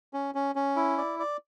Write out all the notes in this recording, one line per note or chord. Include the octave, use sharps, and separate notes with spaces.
C#4
C#4
C#4
E4
D5
D5